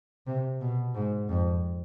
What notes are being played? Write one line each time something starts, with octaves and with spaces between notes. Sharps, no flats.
C3
B2
G#2
F2